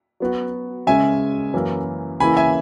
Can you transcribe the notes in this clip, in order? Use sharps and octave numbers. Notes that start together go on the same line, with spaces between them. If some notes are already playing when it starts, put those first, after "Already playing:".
F#3 B3 F#4
C#3 G#3 C#4 E5 G#5
F#2 E3 A#3 E4 A#4
C#3 E3 A#3 E4 G#5 B5
E5 G#5